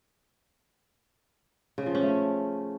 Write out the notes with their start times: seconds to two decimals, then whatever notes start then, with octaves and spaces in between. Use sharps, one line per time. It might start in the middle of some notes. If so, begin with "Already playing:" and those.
1.78 C#3
1.86 F3
1.95 C#4
2.03 A3